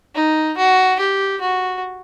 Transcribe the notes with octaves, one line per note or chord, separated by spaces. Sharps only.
D#4
F#4
G4
F#4